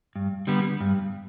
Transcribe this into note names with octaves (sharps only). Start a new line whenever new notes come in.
G2
D3 G3 B3
G2